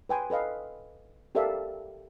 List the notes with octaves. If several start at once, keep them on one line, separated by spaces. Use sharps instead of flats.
B4 G5 G#5 C6
A4 B4 D#5 F5
G4 A4 A#4 D5 E5 F5